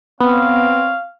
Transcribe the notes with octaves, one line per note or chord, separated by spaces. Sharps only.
B3 C4 C#5 F5